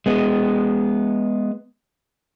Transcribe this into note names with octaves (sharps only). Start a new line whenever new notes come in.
G#3 B3